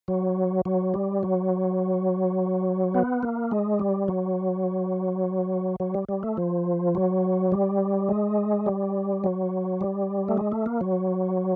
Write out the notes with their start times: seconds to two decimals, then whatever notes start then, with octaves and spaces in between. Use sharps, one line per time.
0.08 F#3
0.65 F#3
0.94 G3
1.23 F#3
2.94 B3
3.23 A#3
3.51 G#3
3.79 G3
4.08 F#3
5.80 F#3
5.94 G3
6.09 G3
6.23 A3
6.37 F3
6.95 F#3
7.52 G3
8.09 G#3
8.66 G3
9.24 F#3
9.81 G3
10.28 A3
10.38 G#3
10.52 A3
10.66 A#3
10.81 F#3